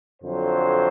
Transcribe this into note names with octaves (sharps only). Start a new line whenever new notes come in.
F2 D3 F#3 C5